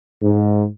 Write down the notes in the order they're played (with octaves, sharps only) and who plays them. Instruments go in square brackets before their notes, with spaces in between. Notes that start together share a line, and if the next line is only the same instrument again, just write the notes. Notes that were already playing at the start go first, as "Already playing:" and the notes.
[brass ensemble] G#2